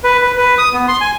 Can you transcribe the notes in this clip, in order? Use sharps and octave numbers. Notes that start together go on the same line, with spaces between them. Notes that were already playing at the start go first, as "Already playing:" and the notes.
B4
B4
B4
D#6
B3
C6
G#5